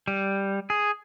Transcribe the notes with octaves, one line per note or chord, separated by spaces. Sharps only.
G3
G#4